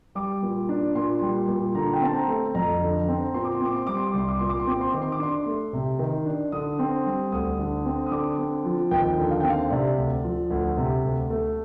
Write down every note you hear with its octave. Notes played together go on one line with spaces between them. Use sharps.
G3 D6
A#2
D4
A#2 C6
G3
A#2
D3 A#5
G5
C4 A5
A#5
A3
F2 A#5
D3
C4
A#2 C6
D6
C6
C4
D6
C6
G3 D6
C6
D6
C2 C6
D6
A#2 C6
D6
C6
C4 D6
C6
D#3 D6
C6
D6
D4 C6
A3
C3
D#3
D4
D3 D#6
C4
G3
D2 D#6
D3
C4
D#6
D3 D6
C4
F3
D#2 G5
D3
F5
C4 G5
F5
C3 D5
D2
F3
D2
C3
D2
A3